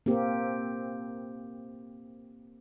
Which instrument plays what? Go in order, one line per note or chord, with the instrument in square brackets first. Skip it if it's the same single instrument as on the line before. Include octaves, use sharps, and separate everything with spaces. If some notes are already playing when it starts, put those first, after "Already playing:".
[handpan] A#3 C4 G4